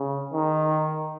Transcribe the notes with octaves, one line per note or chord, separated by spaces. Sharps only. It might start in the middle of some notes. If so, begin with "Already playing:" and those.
Already playing: C#3
D#3